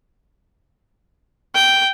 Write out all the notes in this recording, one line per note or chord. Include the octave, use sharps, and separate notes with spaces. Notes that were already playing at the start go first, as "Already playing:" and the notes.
G5